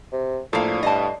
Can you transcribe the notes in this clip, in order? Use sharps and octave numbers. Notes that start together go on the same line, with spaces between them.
C3
A2 F3 A#3 D4 A4 C7
G2 D#5 A5